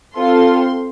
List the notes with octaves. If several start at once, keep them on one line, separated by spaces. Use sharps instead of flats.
C4 F4 A4 C6